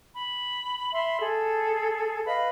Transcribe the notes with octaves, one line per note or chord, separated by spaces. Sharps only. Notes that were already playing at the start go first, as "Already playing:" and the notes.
B5
E5 B5 C6
G#4 A4
B4 D#5 F5 B5